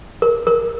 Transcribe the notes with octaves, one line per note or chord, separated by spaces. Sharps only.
A#4
A#4